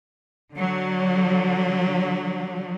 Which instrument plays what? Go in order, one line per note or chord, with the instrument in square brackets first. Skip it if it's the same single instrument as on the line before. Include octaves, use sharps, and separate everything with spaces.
[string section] D3 F#3